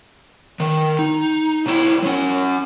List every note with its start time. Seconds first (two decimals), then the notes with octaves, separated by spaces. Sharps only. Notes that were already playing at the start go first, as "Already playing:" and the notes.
0.60 D#3
0.99 D#4
1.66 B1 E4
2.03 F#3 C#4